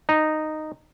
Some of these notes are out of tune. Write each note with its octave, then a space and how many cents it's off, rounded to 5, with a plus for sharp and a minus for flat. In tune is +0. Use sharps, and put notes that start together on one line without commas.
D#4 -10